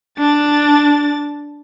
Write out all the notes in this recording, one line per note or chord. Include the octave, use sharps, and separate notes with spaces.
D4 A6